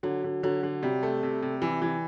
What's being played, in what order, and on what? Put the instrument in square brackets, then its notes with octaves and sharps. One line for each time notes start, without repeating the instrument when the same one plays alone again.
[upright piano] D3 [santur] F#3
[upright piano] D3
[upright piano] D3 [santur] F#3
[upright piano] D3
[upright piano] C3 [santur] G3
[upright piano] A3
C3
C3
E3
E3